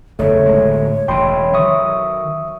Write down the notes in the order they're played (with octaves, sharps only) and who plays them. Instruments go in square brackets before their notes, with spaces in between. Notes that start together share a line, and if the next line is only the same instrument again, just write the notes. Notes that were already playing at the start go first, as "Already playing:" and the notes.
[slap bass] F#1 E2 C#3 [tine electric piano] A3 [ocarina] C#5
[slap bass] D1 G#3
[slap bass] E1 C#3 E3 [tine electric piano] G5 B5 C6
[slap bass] D#3 F#3 [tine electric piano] E5 C#6 D#6